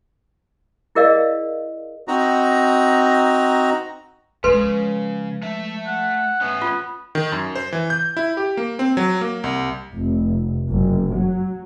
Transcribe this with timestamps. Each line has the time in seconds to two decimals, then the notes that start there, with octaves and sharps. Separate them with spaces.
0.95 E4 G#4 A#4 D5 D#5 F5
2.08 C4 D#4 F#4 A#5
4.44 C#3 F3 G#3 A4 B4 C6
5.42 A3 E5
5.87 F#5
6.41 A3 B3 C#4
6.62 F4
7.15 D#3
7.32 F#2
7.55 C5
7.72 E3
7.90 G6
8.17 E4
8.37 G4
8.57 A#3
8.79 C4
8.97 F#3
9.21 A#3
9.44 C2
9.96 F1
10.69 F#1
11.15 F#3